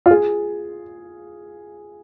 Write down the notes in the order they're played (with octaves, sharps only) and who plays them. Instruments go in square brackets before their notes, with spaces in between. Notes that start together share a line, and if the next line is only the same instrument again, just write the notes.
[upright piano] F4
G#4